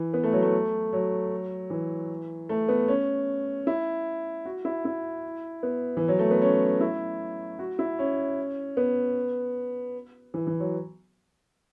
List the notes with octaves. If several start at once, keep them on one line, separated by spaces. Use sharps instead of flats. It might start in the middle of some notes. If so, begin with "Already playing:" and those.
Already playing: E3
B3
A3
F#3
A3
F#3
E3
A3
B3
C#4
E4
F#4
E4
E4
B3
E3
F#3
A3
B3
C#4
E4
F#4
E4
C#4
B3
E3
E3
F#3